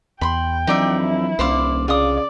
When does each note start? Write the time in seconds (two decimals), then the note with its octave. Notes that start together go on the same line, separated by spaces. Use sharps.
0.21 E2 G5 B5 C6
0.67 F2 E3 F#3 D4 D#4 D5 E5
1.01 E4
1.39 D#1 C2 D4 C5 D5 F5
1.88 C#3 F4 D5 D#6